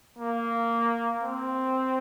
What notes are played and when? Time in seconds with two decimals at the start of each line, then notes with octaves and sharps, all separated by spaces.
0.19 A#3
1.23 C4